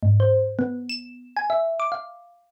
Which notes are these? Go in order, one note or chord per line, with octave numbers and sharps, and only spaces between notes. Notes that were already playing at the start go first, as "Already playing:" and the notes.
G#2
C5
B3
E7
G#5
E5
D6
F5